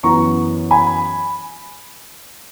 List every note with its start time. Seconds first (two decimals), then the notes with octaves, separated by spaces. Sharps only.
0.03 F#2 E3 B3 A#5 C#6
0.71 G#5 B5